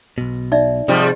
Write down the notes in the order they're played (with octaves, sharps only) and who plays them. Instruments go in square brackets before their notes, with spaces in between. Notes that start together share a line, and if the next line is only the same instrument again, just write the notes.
[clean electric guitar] B1 B2
[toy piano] D#4 D5 E5
[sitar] G#2 F3 G3 [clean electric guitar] C3